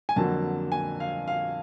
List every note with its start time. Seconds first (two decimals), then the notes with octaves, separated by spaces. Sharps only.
0.09 G#5
0.16 F2 D3 F#3 A#3 A5
0.72 G#5
1.00 F5
1.28 F5